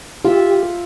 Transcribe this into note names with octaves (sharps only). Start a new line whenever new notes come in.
F4 G4 E5